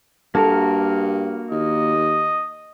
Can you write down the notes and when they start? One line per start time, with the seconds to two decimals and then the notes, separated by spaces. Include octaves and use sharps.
0.35 G2 A#3 F#4 A4 A#4
1.51 D#2 D#5